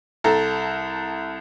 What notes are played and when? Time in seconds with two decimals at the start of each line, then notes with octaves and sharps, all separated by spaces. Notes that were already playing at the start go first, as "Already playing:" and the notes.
0.24 C2 A4 A#5